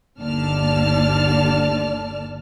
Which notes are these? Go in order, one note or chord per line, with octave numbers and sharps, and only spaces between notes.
G1 D#2 D3 D5 A5 F6